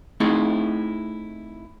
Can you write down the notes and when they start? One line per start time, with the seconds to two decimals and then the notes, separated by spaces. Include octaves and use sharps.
0.20 A3 C4 D#4 E4 G#4